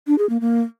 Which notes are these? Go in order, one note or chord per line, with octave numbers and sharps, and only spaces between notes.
D4
G#4
A#3
A#3